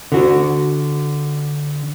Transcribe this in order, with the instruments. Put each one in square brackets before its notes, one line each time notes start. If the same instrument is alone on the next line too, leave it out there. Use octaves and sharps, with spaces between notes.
[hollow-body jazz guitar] D3 F#4